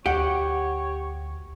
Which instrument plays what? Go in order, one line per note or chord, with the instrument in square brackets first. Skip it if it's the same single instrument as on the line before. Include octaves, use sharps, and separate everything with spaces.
[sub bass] D2 [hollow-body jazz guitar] G4 [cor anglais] C#5 [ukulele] F#5